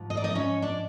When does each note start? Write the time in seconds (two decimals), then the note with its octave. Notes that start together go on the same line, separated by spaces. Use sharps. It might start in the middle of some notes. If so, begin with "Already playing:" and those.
Already playing: G#2 F3
0.10 D#5
0.17 D5
0.24 D#4 D#5
0.35 C#4 C#5
0.62 D4 D5